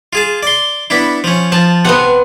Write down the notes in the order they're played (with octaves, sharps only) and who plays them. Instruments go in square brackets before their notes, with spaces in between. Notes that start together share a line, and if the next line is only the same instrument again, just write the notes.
[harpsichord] F4 G#4 A5
D5 C6
B3 D4 E4
F3 C#4
[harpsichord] F3 [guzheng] A5
[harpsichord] C3 [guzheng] B3 C4 F#5